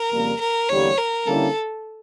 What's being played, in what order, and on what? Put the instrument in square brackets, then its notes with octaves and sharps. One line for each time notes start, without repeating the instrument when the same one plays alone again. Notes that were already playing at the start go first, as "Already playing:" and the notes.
Already playing: [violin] A#4
[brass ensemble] F2 C#3 G3 A#3
[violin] A#4
[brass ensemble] E2 D3 G3 A#3 [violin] C#5
[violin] A#4
[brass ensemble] D3 G3 A#3 C#4 E4 [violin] A4